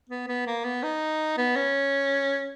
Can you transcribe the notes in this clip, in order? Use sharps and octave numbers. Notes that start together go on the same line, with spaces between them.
B3
B3
A#3
B3
D#4
B3
C#4